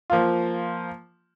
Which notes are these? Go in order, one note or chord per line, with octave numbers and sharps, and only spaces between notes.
F3 A#3 F4